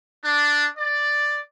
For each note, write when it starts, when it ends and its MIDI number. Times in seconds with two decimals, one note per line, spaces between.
0.24 0.66 62
0.78 1.40 74